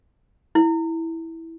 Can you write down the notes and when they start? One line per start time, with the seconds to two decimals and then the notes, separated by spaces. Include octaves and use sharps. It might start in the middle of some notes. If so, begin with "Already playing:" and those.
0.55 E4